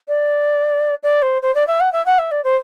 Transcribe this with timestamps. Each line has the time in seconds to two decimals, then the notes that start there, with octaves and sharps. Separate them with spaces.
0.08 D5
1.03 D5
1.22 C5
1.42 C5
1.55 D5
1.67 E5
1.80 F#5
1.92 E5
2.06 F#5
2.18 E5
2.31 D5
2.44 C5